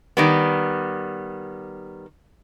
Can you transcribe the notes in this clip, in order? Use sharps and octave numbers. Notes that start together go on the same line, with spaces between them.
D#3 G3 B3